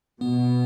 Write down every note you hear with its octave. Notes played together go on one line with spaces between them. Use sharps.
B2 B3